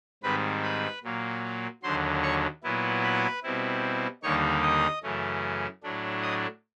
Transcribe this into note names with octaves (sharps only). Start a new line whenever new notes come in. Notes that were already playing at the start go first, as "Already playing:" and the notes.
G#2 D#3 G3 C4 B4 B5
B4 B5
A#2 F#3 A#3
D#2 D3 F#3 C5 C6
C#5 C#6
A#2 F#3 B3 E4
B4 B5
B2 G3 C4 E4
D#2 D3 G3 A#3 D#4 C#5 C#6
D#5 D#6
F#2 C#3 E3 A3 C#4
A2 F#3 A3 D4
D#5 D#6